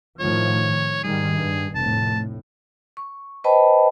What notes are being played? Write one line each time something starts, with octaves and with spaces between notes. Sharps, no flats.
A2 D#3 F3 C#5
G#2 D#3 G3 G#4
G2
F1 A2 A5
C#6
B4 C5 D#5 G5 A5 B5